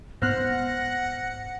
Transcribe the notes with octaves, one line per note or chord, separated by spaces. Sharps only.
G#2 B3 C5 F#5 F6 F#6 A#6